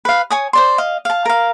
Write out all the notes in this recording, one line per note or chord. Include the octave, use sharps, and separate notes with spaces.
B4 F5
C#5 G#5 D#6
C5 D5 C6
D#5 F5
F5 A5
A#4 F5